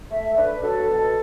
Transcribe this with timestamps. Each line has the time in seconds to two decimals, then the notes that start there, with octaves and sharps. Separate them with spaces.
0.11 A3 E5
0.36 D4 B4
0.63 F#3 A4
0.90 B2